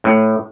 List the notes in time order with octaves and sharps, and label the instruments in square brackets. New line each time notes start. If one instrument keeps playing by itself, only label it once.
[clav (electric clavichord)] A2